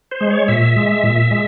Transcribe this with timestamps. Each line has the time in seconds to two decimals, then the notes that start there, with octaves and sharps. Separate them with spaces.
0.11 C5
0.21 G#3
0.30 C#5
0.48 A#2 E5
0.76 G#3
1.04 A#2
1.31 G#3